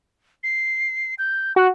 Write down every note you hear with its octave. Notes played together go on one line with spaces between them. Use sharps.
C7
G6
F#4 F#5